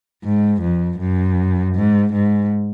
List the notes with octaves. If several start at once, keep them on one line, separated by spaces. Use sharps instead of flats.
G#2
F2
F#2
G#2
G#2